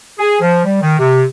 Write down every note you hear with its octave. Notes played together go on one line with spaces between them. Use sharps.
G#4
F3
G3
D#3
C3